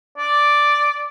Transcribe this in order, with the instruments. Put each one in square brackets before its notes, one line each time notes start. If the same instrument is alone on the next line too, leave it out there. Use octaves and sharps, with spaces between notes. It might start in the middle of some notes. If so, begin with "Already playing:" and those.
[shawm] D5